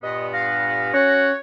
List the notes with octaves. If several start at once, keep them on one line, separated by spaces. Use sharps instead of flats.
G2 A#2 B3 D#5
F5 A#6
C#4 F#4 C#5